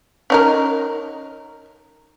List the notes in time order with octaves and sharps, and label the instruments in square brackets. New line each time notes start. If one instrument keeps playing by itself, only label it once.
[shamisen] C#4 D#4 A#4